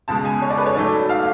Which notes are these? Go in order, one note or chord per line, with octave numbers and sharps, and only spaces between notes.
C#2 B2 G#3 A5
G#5
C#5
D5
B4
C#5
G#2 F#3 A3 D5
F5